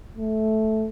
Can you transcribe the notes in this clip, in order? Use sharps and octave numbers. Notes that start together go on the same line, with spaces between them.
A3